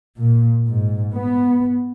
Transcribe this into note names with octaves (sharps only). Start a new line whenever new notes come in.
A#2
G#2
B3